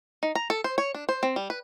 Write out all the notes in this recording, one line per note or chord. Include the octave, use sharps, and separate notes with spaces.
D#4
A#5
A4
C5
C#5
D4
C5
C4
G3
B4